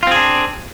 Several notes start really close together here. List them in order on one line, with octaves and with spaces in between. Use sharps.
F4 C4 G#4 D4